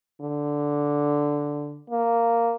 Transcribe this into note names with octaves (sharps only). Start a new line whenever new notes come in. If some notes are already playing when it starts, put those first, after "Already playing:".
D3
A#3